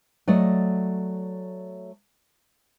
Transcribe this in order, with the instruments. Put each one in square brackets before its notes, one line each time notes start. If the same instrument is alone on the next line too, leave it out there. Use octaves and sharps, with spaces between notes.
[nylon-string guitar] F#3 A3 D5 D#5